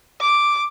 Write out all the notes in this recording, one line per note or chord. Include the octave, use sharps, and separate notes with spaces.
D6